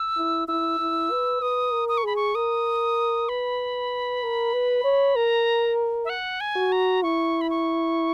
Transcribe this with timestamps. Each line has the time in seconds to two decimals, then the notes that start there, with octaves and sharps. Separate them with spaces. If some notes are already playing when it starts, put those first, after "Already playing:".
Already playing: E6
0.17 E4
0.48 E4 E6
0.79 E4
1.11 B4
1.41 B4 D#6
1.72 A#4
1.89 D#6
1.98 C#6
2.04 G#4 B5
2.16 C#6
2.35 A#4 D#6
3.29 B4 B5
4.23 A#4
4.53 B4
4.84 C#5
5.15 A#4 A#5
6.05 E5
6.10 F#5
6.41 G#5
6.56 F#4
6.72 A#5
7.03 E4 C#6
7.41 B5
7.50 C#6